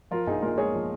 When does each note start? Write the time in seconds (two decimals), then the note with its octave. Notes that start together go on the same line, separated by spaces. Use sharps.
0.11 F3 F4 A#4
0.27 A#1 D#4 G#4
0.42 A#2 F4 A#4
0.57 G#3 G#4 C#5
0.74 F3